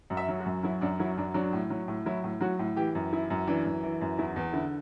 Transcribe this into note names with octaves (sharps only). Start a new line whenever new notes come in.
F#2
E5
F#3
F#4
F#2
F#3 E4
F#2 D4
F#3 E4
F#2 D4
F#3 D4
A2
F#3
A2
F#3 E4
A2
F#3 F#4
A2
E3 G4
F#2
E3 E4
F#2
E3 D4
F#2
E3
F#2
E2 E4
E2
D3 E4